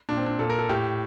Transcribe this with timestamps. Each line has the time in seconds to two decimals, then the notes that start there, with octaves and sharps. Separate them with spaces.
0.09 A#2 D4
0.17 C4
0.26 D4
0.39 A#2 A4
0.50 A#4
0.59 A4
0.69 A2 G4